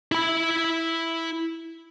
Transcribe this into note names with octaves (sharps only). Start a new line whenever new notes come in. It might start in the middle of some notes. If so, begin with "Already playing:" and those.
E4 B5